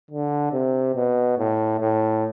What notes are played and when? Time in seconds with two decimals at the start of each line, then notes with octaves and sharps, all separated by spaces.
0.11 D3
0.53 C3
0.96 B2
1.38 A2
1.80 A2